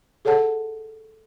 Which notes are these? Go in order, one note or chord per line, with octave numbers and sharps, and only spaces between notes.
G#4 A4 C#5 F#5 A5